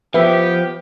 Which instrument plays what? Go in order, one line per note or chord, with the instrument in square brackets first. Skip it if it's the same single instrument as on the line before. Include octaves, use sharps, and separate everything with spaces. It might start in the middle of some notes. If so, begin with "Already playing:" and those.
[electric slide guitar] F3 [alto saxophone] B3 [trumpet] G4 [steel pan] B4 E5